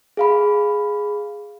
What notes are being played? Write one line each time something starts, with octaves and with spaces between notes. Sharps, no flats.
G#4 F5 B5